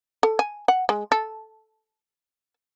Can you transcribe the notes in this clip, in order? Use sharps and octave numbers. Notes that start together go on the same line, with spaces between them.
A4
G#5
F#5
G#3
A4